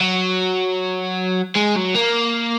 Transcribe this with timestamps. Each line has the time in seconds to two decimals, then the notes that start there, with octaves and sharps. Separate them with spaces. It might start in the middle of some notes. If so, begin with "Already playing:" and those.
0.01 F#3
1.56 G#3
1.76 F#3
1.95 A#3